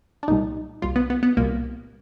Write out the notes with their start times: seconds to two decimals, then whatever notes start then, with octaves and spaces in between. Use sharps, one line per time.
0.23 D4
0.28 C2 A#2 G3 D#4
0.82 C2 A#2 G3 F4
0.96 B3
1.10 B3
1.23 B3
1.37 C2 A#2 G3 A#3